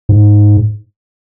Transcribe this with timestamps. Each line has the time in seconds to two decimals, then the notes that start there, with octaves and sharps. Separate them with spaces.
0.09 G#2